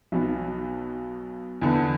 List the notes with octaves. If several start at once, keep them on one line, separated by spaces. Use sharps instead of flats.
B1 B2 B3
E2 D3 B3